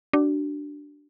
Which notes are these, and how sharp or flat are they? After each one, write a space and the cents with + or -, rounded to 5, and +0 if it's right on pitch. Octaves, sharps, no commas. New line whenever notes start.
D4 +0 F#4 +40